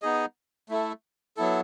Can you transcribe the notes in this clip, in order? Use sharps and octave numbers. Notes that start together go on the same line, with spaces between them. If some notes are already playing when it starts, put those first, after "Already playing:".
B3 D#4 G#4 D#5
A3 E4 A4
F#3 B3 E4 A4